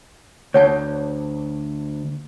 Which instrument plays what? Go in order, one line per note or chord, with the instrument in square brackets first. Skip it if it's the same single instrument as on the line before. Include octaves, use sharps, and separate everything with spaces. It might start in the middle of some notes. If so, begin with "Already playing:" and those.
[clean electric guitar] D2 [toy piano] C#5 F#5 A5